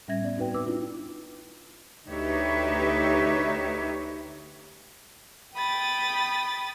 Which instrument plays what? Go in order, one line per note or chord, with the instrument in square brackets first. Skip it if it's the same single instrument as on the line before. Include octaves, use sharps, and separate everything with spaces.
[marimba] A2 G3 C#4 E5 G#6 A#6
B3 D5
C4 D#4 F#4 B4 G5
D#4 B4 D6 E6
D4 E4 F4
[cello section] D2 D#4 G4 B4 C#5 E5
[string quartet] G5 B5 D#6 A6